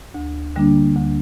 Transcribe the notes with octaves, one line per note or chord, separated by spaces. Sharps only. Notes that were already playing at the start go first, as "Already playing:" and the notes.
D2
D3 G3 A#3 D4
D2